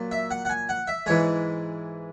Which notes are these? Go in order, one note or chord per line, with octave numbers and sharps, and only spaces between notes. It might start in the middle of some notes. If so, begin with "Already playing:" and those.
Already playing: A#2 F#3
E5
F#5
F#5
G#5
F#5
E5
G#2 E3 G#3 C#5